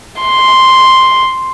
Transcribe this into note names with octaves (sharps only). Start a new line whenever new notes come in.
C6